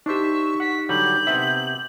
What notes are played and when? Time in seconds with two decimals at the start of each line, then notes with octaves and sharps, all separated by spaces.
0.06 D4 D#4 G4 C5 E5 C#6
0.60 F#5 B6
0.89 D3 F#3 G3 G6 F#7
1.27 C3 B3 E5